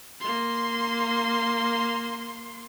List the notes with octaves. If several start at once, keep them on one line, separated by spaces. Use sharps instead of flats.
A#3 C6